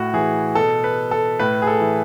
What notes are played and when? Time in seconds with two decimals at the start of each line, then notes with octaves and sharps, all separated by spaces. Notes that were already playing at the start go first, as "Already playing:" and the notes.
Already playing: A2 F#4
0.13 E3 G#4
0.55 B2 A4
0.84 B4
1.11 A4
1.39 A2 B4
1.62 G#4
1.67 A4
1.80 E3